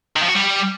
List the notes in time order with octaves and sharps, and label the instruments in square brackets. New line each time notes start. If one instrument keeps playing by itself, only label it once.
[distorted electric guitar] D#3
F3
F#4
G3